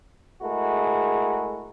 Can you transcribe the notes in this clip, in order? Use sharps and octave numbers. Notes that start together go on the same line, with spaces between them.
G#3 A3 E4 F#4 G#4 A#4